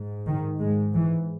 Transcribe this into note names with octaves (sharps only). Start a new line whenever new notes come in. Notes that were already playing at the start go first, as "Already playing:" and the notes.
Already playing: G#2
D#3
G#2 G#3
E3